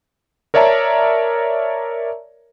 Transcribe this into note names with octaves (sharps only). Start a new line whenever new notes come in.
A#4 C#5 D5 E5 A5 A#5